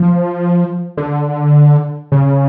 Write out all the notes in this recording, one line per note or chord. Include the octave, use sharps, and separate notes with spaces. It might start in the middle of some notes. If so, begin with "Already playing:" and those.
Already playing: F3
D3
C#3